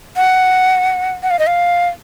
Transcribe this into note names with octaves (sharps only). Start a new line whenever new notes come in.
F#5
F#5
F5
D#5
F5